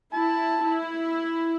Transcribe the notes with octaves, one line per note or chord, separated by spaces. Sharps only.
E4 A5
E4